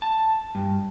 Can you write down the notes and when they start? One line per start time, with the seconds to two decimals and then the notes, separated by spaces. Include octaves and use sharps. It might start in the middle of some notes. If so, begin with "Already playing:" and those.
0.02 A5
0.55 G2